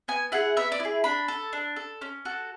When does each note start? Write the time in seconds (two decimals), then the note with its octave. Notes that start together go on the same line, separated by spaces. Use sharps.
0.08 B3 G#5
0.32 E4 G#4 F#5
0.57 B3 E5
0.72 D5
0.80 E4
0.85 G#4
1.04 D4 B5
1.28 A4
1.53 D4
1.76 A4
2.01 C#4
2.25 F#4 A4